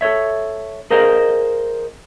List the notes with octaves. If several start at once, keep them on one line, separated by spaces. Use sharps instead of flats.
A4 C5 C#5 E5
G#4 A#4 C5 D#5 F5